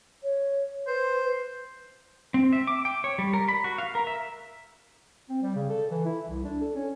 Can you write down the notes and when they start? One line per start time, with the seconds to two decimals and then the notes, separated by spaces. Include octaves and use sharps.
0.23 C#5
0.87 B4 C5
2.34 C4
2.53 E5
2.67 D6
2.85 G5
3.04 C#5
3.18 G3
3.33 A#4
3.48 B5
3.64 F#4
3.78 F5
3.95 A#4
4.07 E5
5.29 C4
5.43 G3
5.55 C#3
5.70 A4
5.90 E3
6.05 E4
6.29 C2
6.44 D4
6.61 A4
6.75 C#4